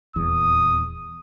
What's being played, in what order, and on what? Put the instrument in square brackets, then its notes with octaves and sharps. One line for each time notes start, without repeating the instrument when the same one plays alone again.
[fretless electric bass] D#1 E2 [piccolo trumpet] D#6